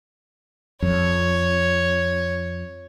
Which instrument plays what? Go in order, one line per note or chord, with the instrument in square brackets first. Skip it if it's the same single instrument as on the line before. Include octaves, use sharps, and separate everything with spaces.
[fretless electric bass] F2 [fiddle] C#5